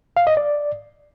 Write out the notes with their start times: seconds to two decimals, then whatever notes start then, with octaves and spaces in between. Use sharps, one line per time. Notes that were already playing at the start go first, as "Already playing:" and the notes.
0.17 F5
0.27 D#5
0.37 D5